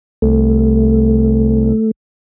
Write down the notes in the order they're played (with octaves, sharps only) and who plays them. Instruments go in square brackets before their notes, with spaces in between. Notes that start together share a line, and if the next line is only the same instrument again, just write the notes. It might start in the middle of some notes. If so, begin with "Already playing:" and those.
[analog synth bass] C2 [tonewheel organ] A3